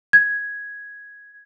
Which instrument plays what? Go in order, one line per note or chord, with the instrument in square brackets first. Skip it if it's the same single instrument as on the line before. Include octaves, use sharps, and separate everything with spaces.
[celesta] G#6